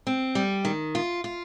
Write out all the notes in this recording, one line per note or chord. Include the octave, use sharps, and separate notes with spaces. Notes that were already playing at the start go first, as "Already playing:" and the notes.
C4
G3
D#3
F4
F4